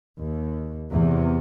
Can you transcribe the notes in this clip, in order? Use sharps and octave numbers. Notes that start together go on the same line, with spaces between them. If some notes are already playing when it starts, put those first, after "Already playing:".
D#2
E2 C3 E3